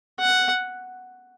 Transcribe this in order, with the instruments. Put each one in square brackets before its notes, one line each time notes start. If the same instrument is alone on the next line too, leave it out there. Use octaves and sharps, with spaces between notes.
[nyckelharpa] F#5